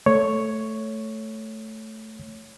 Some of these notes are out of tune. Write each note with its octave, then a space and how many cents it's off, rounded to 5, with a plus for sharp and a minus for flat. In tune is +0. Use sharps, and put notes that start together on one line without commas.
A3 +0 C#5 +0